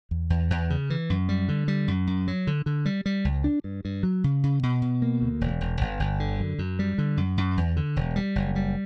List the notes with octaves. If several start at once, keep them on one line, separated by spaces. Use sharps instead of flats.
E2
E2
E2
C#3
E3
F#2
G3
D3
G3
F#2
F#2
F#3
D3
D3
G3
G3
C#2
D4
G2
G2
F#3
C#3
C#3
B2
B2
A#3
D2
E1
E1
G1
G1
D3
F#2
F#2
G3
D3
F#2
F#2
E2
D3
E1
G3
F#1
G3